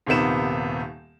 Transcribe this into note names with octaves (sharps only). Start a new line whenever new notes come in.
D#1 D#2 C3 D#3 B3 E7